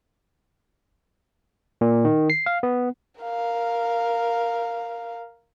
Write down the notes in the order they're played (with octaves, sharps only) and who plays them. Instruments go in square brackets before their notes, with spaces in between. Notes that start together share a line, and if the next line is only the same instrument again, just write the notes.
[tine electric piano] A#2
D#3
C7
F5
B3
[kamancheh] A#4 F5